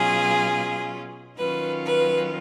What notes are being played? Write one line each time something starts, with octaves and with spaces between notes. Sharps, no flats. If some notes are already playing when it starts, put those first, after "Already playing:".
Already playing: B2 F#3 C#4 F4 G#4
D#3 F#3 C#4 F4 B4
B4